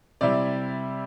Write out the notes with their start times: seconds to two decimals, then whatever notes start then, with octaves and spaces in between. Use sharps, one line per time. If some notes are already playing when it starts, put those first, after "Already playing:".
0.21 C3 G3 E4 D5